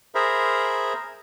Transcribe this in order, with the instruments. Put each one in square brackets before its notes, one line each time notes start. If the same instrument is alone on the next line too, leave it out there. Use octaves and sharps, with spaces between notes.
[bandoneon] G#4 A#4 C5 E5 A#5 B5